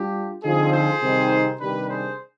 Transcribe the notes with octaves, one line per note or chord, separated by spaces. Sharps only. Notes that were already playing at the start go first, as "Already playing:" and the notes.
Already playing: G3 D4 F4 G4
D3 F3 C4 D#4 F4 G#4
G#4 C5
C3 D#3 G3 C4 D#4
C3 D#3 G3 D4 G4 B4
G#4 C5